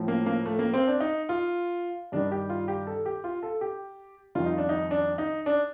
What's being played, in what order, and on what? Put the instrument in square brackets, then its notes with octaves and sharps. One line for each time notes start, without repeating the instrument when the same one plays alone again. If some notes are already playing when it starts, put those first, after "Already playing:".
Already playing: [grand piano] A2 F3
A#3
A#3
A3
A#3
C4
D4
D#4
F4
G2 D#3 G3 D4
G4
F4
G4
A4
G4
F4
A4
G4
F2 D#3 G3 F4
D#4
D4
D#4
D4
D#4
D4